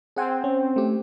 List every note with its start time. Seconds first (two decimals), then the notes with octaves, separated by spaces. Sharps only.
0.16 C4 G#4 F#5 G#5
0.44 C#4
0.76 A3 G4